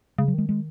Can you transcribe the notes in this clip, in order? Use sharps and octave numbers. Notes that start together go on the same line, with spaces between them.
C#3 G#3
F#3
D#3 G#3
G#3